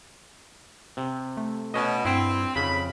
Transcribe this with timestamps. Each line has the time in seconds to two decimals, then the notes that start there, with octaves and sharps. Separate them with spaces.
0.97 C3
1.37 A3
1.74 B2 C#4 D#5
2.05 G2 C4 E4
2.56 F2 G#2 C#3 B5